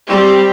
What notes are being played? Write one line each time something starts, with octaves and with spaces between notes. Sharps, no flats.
G3 C4 G4